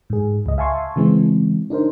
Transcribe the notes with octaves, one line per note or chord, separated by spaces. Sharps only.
G#2 G#4
C#2 D#5
E5 F5 G#5 A5 C6 C#6
C#3 E3 G#3 C4
D4 D#4 A#4 C5